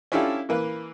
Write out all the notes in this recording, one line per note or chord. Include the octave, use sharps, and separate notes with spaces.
C#4 D4 E4 F4 G4 A4
E3 A#3 B4